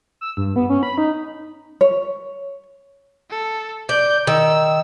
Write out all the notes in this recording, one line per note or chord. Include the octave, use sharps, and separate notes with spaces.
E6
G2
B3
C#4
B5
D#4
C#5
A4
D5 G6
D#3 E6